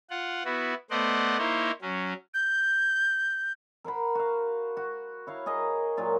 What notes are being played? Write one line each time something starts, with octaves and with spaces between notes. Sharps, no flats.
F4 F#5
B3 E4 F#4
A3 B3 C5 D5 D#5 F#5
A#3 D#4 E4 C5 C#5
F#3 C#4
G6
A#4 C5 F#5 B5
F#4 F5
F#4
E4 C#5 F5
G#4 A#4 D#5
A#2 F#3 F4